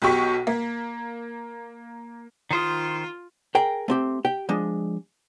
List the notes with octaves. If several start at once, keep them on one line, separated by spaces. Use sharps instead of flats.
B1 B2 G4 C#6 B6
A#3
D#3 F4 C5 D#6
G#4 A#4 G5
A3 C4 G4
G4 G5
F3 G#3 D4